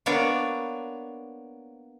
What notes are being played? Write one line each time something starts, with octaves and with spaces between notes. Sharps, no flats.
A#3 B3 D4 C#5 D5 F5